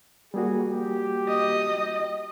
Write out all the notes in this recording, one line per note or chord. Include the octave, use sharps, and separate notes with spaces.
G3 A#3 F#4 G#4
G4
D#5